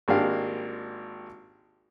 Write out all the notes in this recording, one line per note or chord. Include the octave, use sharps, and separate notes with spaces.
G#1 G#3 A#3 D4 G4 F5